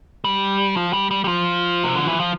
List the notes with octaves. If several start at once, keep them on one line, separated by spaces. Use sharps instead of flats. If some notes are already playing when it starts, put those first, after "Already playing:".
G3
F3
G3
G3
G3
F3
C3
D3
E3
F3